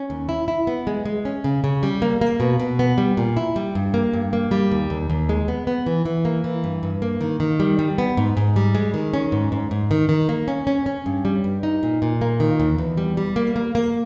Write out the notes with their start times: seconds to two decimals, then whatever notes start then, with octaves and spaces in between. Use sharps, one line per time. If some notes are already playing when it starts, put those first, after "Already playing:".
Already playing: C#4
0.10 D#2
0.29 E4
0.48 E4
0.67 B3
0.87 G#3
1.06 G#3
1.25 C#4
1.44 C#3
1.64 C#3
1.83 G3
2.02 A#3
2.21 A#3
2.40 B2
2.60 B2
2.79 B3
2.98 G3
3.17 A#2
3.37 E4
3.56 G3
3.75 G2
3.94 A#3
4.13 G2
4.33 A#3
4.51 G3
4.72 D#2
4.90 D#2
5.10 D#2
5.29 G#3
5.48 B3
5.67 B3
5.86 E3
6.06 E3
6.25 A#3
6.44 E3
6.64 G2
6.83 G2
7.02 A#3
7.21 D#3
7.40 D#3
7.60 G3
7.79 G3
7.98 B3
8.17 G#2
8.37 G#2
8.56 G3
8.75 G#3
8.94 D#3
9.14 C#4
9.32 G#2
9.52 G#2
9.71 G#2
9.91 D#3
10.09 D#3
10.29 A#3
10.48 C#4
10.67 C#4
10.86 C#4
11.06 G2
11.25 G3
11.44 G2
11.63 D#4
11.83 A#2
12.02 A#2
12.21 A#3
12.40 D#3
12.60 D#2
12.78 E2
12.97 G3
13.17 G3
13.36 A#3
13.56 A#3
13.75 A#3